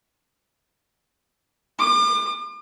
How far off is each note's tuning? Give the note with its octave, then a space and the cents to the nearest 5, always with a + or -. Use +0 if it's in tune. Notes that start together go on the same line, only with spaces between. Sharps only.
D6 +40